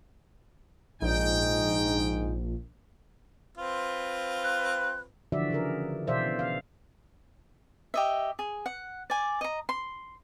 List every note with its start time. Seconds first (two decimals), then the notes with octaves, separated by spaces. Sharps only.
1.02 A#1 G#2 D#4 G5
3.57 C4 F4 B4
4.43 F#6
5.32 D3 E3 F3 F#4 D5 E5
5.50 C#3 G#4 A#4
6.07 B2 E3 C5 D5 E5 F5
6.39 F5
7.94 G4 D#5 E5
8.39 G#4
8.66 F#5
9.10 D5 G#5
9.41 D#5 A#5
9.69 C6